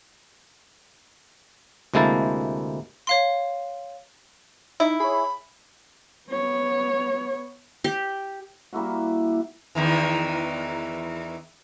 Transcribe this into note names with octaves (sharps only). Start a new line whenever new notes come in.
D2 C3 G#3 A#3 E4 A5
C#5 F5 C6
D#4 E4
G#4 C#5 B5
B3 C#5
G4
G3 A#3 E4 F#4
E2 D#3 E3